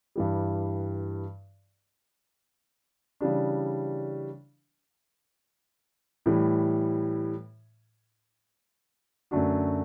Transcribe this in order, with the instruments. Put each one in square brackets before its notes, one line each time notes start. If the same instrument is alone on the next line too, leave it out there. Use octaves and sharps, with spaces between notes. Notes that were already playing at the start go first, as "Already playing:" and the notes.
[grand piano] G2 E3 G3
C#3 E3 G3 D4
A2 E3 G3
F#2 D3 A3 D4 F#4